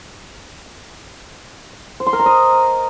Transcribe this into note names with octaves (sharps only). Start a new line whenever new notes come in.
C5
C6
A#4
A#5
D#5